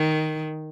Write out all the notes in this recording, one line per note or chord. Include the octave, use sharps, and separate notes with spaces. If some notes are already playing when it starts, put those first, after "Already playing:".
Already playing: D#3